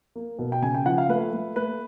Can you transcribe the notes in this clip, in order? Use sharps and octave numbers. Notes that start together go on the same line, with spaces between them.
A#3
B2
G5
C#3 G#5
G5
F3 F#5
F5
A3 B4
A3
A3 B4